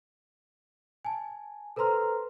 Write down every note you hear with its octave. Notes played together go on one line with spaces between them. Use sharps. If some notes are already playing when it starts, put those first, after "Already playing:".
G#5 A5
A4 B4 C5 A#5 C6 F6